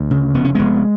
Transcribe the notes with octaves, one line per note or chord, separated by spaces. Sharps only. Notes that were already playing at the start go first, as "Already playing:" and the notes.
Already playing: D2
C#3
F1 B3
C#4
F1 G#3 B3